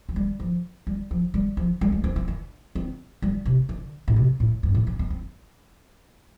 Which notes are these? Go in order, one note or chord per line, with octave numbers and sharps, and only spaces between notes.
F3
G3
F3
G3
F3
G3
F3
G3
A3
C4
C4
D4
C4
G3
C3
D3
A2
C3
A2
G2
A2
D3
C4
C4